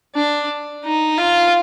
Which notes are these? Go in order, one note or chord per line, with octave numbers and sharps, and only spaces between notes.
D4
D#4
F4